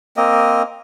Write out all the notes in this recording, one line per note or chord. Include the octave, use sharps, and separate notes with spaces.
A#3 C4 D#5